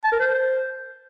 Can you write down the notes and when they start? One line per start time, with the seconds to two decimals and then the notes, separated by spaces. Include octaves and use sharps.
0.04 A5
0.12 A#4
0.20 C5